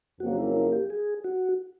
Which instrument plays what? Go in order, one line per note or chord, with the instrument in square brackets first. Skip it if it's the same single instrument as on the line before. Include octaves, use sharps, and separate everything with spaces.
[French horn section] F2 C#3 F#3 A#3 [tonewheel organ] F#4
[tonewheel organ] E4
E4
G4
G#4
F#4